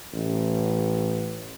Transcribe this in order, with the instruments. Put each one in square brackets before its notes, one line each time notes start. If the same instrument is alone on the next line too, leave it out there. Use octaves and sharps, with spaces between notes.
[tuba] A1